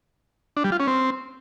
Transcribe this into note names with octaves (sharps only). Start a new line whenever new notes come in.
D4
G3
F4
C#4
C4